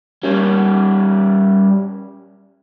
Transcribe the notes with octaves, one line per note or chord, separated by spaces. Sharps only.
G3 C#4